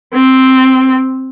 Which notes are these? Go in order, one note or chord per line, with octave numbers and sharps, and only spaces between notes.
C4